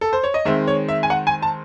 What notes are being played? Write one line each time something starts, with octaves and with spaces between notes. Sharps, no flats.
A4
C5
C#5
D#5
D#3 G#3 C4 E5
C#5
E5
G#5
F#5
G#5
A5